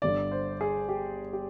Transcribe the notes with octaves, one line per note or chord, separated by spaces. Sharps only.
G1 G2 D3 D5
C5
G#4
G4
G4